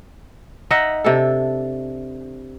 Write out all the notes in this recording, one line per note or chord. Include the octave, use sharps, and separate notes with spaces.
D#4 D#5 E5 F#5
C3 D4 A4